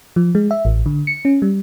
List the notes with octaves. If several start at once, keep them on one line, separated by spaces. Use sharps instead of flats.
F3
G#3
E5
A1
D3
C#7
C#4
G3